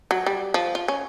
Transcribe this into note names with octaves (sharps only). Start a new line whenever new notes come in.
F#3
G3
F3
F4
C#4